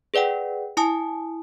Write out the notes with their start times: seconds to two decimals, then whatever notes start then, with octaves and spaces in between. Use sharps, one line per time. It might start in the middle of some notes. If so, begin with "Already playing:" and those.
0.14 G#4 B4 D5 F#5 G5
0.77 E4 G#5 A5 D#6